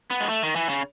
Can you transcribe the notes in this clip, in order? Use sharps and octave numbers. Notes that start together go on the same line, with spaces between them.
B3
G#3
A3
D#3
E3
C#3